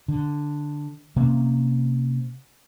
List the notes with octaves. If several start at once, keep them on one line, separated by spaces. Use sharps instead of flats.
D3
C3 A#3 C4 C#4